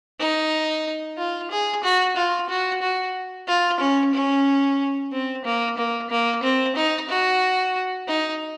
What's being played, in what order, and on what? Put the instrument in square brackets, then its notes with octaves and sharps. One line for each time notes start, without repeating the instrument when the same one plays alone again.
[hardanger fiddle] D#4
F4
G#4
F#4
F4
F#4
F#4
F4
C#4
C#4
C4
A#3
A#3
A#3
C4
D#4
F#4
D#4